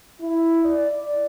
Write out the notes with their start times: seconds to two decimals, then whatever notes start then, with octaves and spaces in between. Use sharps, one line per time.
0.19 E4
0.64 D5